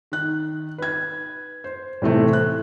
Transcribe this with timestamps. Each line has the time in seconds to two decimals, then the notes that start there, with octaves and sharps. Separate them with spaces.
0.12 D#3 F#6
0.78 B4 G#6
1.64 C5
2.02 A2 C3 E3 A3 C4
2.33 F#6